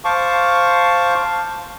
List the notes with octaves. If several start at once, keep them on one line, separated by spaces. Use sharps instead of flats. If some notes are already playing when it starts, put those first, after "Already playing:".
C5 F5 A5 C#6 D6